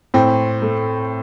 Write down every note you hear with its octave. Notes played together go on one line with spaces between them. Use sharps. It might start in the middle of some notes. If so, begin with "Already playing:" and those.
A2 C4
A3